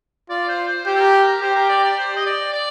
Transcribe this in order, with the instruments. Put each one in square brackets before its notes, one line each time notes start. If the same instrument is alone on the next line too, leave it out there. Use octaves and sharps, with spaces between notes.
[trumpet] F4 [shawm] D5
[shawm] C5
C5
[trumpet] G4 [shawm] C5
[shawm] A4
A#4
A#4
A#4
[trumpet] G4 [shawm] C5
[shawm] A#4
D5
D5
C5
D#5
D5
D5